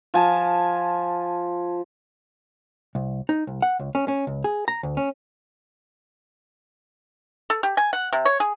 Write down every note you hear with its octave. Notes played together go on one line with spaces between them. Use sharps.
F3 G#5 A5
C2
D#4
C2
F#5
C#2
C#4
C#4
C#2
G#4
A#5
D2
C#4
A4
G4
G#5
F#5
C3
C#5
G#4